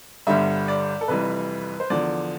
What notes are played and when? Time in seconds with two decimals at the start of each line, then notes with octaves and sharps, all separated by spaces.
0.27 G1 G2 D3 G3 E5
0.68 D5
1.01 A4
1.08 F1 F2 E3 G3 B4
1.80 C5
1.90 E2 D3 F3 D5